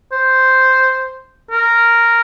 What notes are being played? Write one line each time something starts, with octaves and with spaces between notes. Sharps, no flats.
C5
A#4